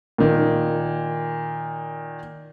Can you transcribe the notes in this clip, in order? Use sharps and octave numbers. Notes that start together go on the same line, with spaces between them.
A#2 D#3